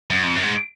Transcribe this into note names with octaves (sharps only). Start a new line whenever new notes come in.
F#2
F2
F#2
G#2